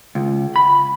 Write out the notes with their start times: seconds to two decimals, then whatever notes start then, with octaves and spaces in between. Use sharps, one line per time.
0.15 C#2
0.56 B5